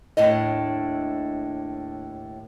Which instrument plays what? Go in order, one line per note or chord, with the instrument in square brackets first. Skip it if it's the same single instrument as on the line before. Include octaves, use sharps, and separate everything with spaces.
[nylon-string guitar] D#2 A2 D4 D#5